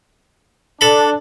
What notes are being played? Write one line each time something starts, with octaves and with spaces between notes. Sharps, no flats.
D4 A4 B5